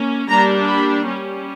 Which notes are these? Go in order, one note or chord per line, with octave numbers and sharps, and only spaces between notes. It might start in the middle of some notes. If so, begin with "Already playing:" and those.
Already playing: A#3 C#4
G3 A#3 D4 A#5
B5
G3 C#4